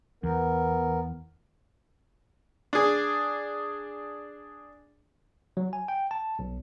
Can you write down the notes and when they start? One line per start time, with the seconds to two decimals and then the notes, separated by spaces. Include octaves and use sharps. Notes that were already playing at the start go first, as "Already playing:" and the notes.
0.24 E2 B3 A#4
2.73 D4 G#4
5.57 F#3
5.73 G#5
5.88 G5
6.11 A5
6.39 B1